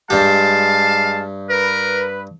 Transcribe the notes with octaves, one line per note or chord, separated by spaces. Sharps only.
G2 G#3 G4 F5 A5
A#4 B4